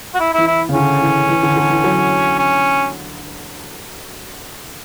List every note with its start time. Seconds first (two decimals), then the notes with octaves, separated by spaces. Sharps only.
0.15 F#4
0.20 E4
0.34 E3 E4
0.47 E4
0.69 C#3
0.74 D3 C#4
1.01 E3
1.29 E3
1.43 D3
1.56 D3
1.70 E3
1.84 F#3
2.39 C#4